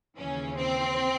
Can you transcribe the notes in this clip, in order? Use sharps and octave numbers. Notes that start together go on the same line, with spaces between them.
D#2 C#3 E3 C#4
C4